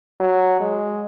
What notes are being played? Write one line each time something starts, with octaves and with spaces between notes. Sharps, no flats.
F#3
G#3